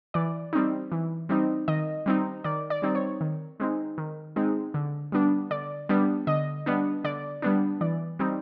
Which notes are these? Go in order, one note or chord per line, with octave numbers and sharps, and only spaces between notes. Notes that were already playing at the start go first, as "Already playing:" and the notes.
E3 D5
G3 C4 D#4
E3
G3 C4 D#4
D#3 D#5
G3 C4 D#4
D#3 D5
D5
G3 C4 D#4
C#5
D#3
G#3 C4 D#4
D#3
G#3 C4 D#4
D3
G3 B3 D4
D3 D5
G3 B3 D4
D3 D#5
G3 B3 D4
D3 D5
G3 B3 D4
E3 D5
G3 C4 D#4